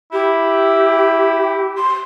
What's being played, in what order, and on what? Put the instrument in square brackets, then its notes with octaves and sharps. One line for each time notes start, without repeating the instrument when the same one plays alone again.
[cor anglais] E4 [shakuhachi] G4
[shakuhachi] C6